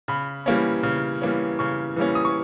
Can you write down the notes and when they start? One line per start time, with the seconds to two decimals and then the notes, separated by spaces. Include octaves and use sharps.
0.08 C#3 B5
0.46 E3 G3 A#3 C#4
0.83 C#3
1.22 E3 G3 A#3 C#4
1.59 C#3 C#6
1.96 E3 G3 A#3 C#4
2.15 D#6
2.25 C#6